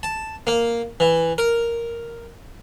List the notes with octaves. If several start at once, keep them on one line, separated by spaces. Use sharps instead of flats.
A5
A#3
E3
A#4